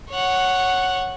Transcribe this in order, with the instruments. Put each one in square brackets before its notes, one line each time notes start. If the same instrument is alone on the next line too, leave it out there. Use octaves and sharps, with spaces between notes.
[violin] C#5 F#5